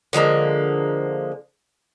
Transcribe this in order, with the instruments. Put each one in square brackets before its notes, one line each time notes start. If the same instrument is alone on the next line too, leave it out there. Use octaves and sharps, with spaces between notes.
[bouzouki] D3 F3 G#3 A#3